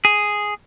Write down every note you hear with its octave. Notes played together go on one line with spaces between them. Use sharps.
G#4